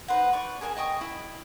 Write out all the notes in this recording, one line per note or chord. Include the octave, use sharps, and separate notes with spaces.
D#4 B4 C5 F#5
B4 D5 C#6
G#4 A#4 G#5 A5
D#5 G5 C#6 D#6
E4